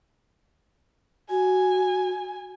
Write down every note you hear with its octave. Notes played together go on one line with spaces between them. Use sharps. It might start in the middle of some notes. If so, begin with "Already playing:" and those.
F#4 G#5